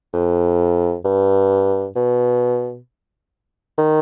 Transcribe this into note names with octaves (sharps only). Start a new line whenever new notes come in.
F2
G2
B2
D#3